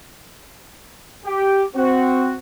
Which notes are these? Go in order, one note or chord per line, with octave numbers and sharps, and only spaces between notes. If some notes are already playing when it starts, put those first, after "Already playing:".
G4
C4 F#4